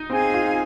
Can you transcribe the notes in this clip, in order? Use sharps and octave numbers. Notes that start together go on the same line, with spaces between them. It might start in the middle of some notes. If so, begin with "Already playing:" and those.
Already playing: D#4
C4 G#4 F5 G#5 C6
F4